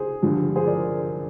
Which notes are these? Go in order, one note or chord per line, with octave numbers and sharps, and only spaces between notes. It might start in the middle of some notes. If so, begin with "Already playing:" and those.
Already playing: G#4 C5
G2 D3 F3
G#4 C5
A#4 D5